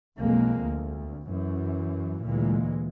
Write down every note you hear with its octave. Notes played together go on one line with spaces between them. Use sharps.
B1 F2 G#3 A#3
D2
F#2 E3
D2 A#2 E3 G#3